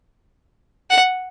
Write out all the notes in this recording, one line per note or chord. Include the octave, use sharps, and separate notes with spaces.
F#5